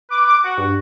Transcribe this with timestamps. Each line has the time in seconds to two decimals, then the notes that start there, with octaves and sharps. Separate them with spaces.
0.10 B4 D6
0.27 D6
0.44 F#4 F#5
0.58 G2